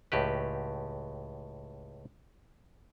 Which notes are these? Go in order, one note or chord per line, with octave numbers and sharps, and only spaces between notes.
C#2 A2 G4 B4